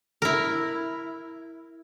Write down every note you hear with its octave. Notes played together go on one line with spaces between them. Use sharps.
E4 A#4